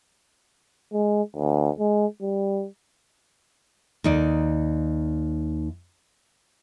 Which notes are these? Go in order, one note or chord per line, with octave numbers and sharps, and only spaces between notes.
G#3
D2
G#3
G3
D#2 D#4 D5